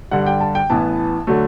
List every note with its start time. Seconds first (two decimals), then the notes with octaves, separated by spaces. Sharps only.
0.11 G2 D3 G3 F#5
0.26 G5
0.40 A5
0.55 G5
0.70 A1 A2 E3 B3 A5
1.27 D3 F#3 A3